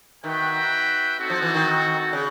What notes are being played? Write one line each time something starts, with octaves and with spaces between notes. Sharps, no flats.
D#3 F#4 B4 E5 G5
C4 D#4 F#4 A4
F3
E3
D#3
C#3